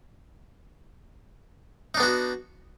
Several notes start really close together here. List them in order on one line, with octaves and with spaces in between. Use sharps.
D#4 D4 B3 F#4